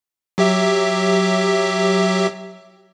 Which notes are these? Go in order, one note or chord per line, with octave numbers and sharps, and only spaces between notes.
F#3 G4 E5